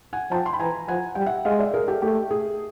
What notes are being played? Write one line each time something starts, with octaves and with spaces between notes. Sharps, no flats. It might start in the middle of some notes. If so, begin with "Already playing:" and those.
F#5 G#5
F3 G5 A5
C6
B5
E3 G#5 A#5
F3 F#5 G#5
G3 G5
E5 F#5
G#3 D#5 F5
D5 E5
G#4 A#4
G4 A4
A3 G4
G#4